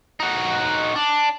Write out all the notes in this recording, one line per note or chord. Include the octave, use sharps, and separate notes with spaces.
D#4 F#4
D4